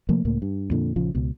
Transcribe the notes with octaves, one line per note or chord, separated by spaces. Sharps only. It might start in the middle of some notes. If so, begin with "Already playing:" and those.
C3 F3 A3 A#3
C#2 A2 A#3
G2
F2 A#2 D3
A#1 C#3 F3
C#2 B2